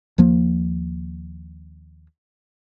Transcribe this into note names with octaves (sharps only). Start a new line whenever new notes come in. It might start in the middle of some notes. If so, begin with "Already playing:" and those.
D#2 F3 A#3